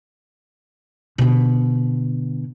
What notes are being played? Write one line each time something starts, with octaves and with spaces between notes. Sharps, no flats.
B2 D3